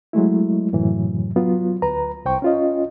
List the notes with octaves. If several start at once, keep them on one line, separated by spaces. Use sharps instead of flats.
F#3 G#3 A3 E4
F#2 A2 C3 E3 F#3
F#3 B3 F4
D2 B4 A#5
C2 C5 G5 C#6
C#4 F4 D#5